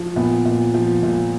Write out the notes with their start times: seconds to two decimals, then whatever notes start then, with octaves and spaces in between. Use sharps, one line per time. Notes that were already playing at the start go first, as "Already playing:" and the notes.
Already playing: F3
0.16 A#2 B3
0.45 A#2
0.74 F3
1.03 A#2